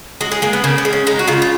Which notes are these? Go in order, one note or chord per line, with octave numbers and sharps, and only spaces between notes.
G#3 F#4
G#4
G#3 A#3
B3
C#3 A#3
B3
G#3
C#4
G#3 D#4
F#4
C#3 F4
F4